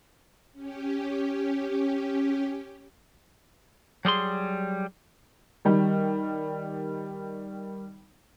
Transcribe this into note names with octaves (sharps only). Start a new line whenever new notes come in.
C#4 G4
F#3 G3 G#4 C6
D#3 G3